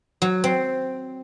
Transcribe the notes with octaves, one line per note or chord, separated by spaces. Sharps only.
F#3
C4